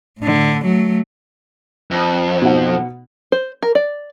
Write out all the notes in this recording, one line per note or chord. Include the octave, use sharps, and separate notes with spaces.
A2 D3
F#3 A3
F2
B2 D#4 F#5
C5
A#4
D5